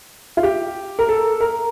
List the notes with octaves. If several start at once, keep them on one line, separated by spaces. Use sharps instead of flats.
F4
G4
A#4
A4
A#4